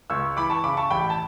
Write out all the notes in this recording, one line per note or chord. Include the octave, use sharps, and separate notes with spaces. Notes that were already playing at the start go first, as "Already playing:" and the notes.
C#2 C#6 E6
E3 B5 D6
A5 C#6
C#3 B5 D6
A5 C#6
A1 G5 B5
A5